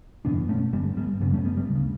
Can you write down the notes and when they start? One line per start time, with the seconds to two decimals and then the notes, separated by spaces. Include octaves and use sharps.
0.25 F#1 E2 B2 B3 D4
0.49 A3 C#4
0.73 G1 G2 D3 G3 B3
0.97 G3 B3
1.21 G1 F#2 C#3 G3 B3
1.33 A3 C#4
1.45 G3 B3
1.57 G3 B3
1.70 D2 C#3